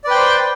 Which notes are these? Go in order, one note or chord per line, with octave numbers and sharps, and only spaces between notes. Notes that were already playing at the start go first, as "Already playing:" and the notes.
B4 C5 D5 G5